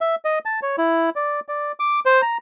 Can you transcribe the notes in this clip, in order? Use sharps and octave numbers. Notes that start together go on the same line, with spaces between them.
E5
D#5
A5
C#5
E4
D5
D5
D6
C5
A#5